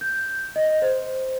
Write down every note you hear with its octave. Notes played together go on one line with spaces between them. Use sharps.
G6
D#5
C5